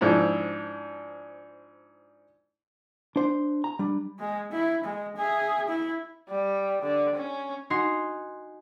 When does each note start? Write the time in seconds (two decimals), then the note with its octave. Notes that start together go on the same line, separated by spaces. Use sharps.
0.01 G#2 F3 D4 E4
3.16 D4 C5
3.64 A#5
3.79 G3 D4
4.19 G#3
4.52 E4
4.84 G#3
5.17 G#4 E5
5.68 E4
6.29 G3
6.83 D3
7.15 C#4
7.70 D#4 F#4 G#5 C6